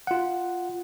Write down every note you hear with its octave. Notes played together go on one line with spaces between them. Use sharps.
F4 F#5